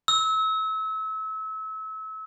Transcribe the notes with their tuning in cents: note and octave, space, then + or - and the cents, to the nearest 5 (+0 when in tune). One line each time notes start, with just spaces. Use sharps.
E6 -30